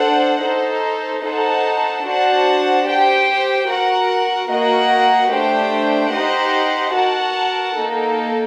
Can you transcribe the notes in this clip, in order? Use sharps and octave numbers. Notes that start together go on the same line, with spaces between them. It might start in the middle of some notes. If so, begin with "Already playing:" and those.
Already playing: D4 A4 C5 F#5
D#4 A4 C5
D#4 A4 C5 F#5 A5
D4 F#4 C5 F#5 A5
G4 C5 G5
F#4 A#4 F#5
A#3 F#4 A#4 D#5 F#5
A3 D4 G4 C5 G5
D#4 G4 C5 D#5 F#5
F#4 A#4 F#5 A5
A#3 D#4 A4